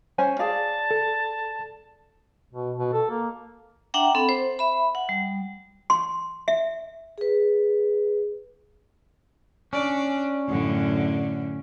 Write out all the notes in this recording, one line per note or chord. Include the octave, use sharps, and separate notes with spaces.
C#4 C5 G#5
G#4 D5 F5 A5
A4
B2
B2
A4
A#3
D4 E5 F#5 G5 A#5
C4 A4 B5
C5
E5 B5
F#5
G3
C6
E5
G#4 B4
C#4 D4 D5
F#2 A2 D3